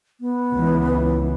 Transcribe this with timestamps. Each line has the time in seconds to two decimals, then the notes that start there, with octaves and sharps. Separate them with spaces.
0.21 B3
0.54 C#2 E3